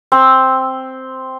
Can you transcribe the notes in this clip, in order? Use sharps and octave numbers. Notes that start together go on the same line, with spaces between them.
C4